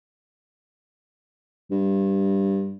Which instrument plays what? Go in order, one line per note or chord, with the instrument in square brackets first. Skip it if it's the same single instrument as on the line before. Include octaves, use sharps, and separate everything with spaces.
[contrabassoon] G2